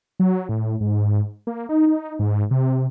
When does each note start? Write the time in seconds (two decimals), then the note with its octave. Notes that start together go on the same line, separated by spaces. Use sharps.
0.20 F#3
0.49 A2
0.81 G#2
1.47 A#3
1.69 D#4
1.86 D#4
2.19 G#2
2.51 C3